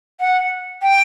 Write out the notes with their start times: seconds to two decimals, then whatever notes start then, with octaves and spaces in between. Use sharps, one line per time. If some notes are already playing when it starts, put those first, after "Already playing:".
0.20 F#5
0.82 G5